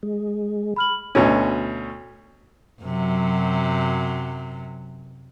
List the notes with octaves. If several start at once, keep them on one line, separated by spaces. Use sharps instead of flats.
G#3
B5 F6 F#7
D2 B2 C#4
F#2 C3 F#3